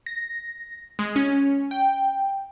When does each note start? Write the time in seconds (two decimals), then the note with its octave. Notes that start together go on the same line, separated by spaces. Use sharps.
0.06 A#6
0.99 G#3
1.16 C#4
1.71 G5